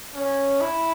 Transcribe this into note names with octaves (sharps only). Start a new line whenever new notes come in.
C#4
E4